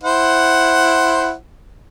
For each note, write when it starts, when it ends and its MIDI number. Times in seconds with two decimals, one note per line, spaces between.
0.04 1.32 64
0.04 1.32 72
0.04 1.32 78